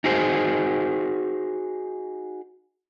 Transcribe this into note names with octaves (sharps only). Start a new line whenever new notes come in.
D#4 F#4 G#4 C5